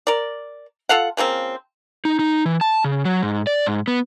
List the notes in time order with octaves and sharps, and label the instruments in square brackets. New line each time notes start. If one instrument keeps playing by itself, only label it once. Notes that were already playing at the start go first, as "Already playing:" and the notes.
[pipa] A#4 D5
F4 A4 F5 F#5
C#3 F3 A#3 C4
[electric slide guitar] D#4
D#4
E3
A5
C#3
F#3
G#2
D5
G#2
B3